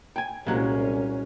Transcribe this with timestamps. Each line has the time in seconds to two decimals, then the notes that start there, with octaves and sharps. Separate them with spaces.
0.16 G5 G#5
0.46 C2 A#2 F#3 G#3 C#4